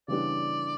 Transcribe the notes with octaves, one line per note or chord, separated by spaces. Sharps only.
C#3 E3 G3 B3 D4 D5